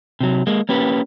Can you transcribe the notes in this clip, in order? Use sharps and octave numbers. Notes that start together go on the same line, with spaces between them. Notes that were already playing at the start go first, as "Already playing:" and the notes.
C3 F#3
G#3 A#3
A#3 C#4 G4 B4